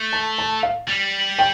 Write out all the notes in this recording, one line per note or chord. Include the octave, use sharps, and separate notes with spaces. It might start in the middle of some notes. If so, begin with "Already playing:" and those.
Already playing: A3
A5
A5
F5
G3
G5